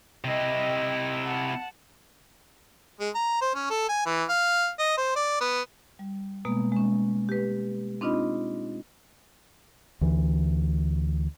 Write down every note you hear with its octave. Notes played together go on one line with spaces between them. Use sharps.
C3 E4 D#5 G5
F#5 A5
G#3
A#5
C5
C#4
A4
G#5
E3
F5
D#5
C5
D5
B3
G3
B2 G#3 A#3 B3
G#3 C#4
G4 B4
C4 D4 D#4 F4 D#5 B5
D2 E3